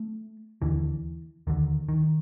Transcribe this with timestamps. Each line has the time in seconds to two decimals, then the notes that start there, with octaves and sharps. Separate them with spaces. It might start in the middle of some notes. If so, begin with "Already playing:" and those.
Already playing: A3
0.62 D#2 D3 E3
1.47 D#2 D3 D#3
1.89 D#3